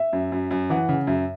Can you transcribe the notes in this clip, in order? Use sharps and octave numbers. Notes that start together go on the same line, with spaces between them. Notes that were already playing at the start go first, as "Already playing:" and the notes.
Already playing: E5
F#2
F#2
F#2
E3 F#5
C#3
F#2 E5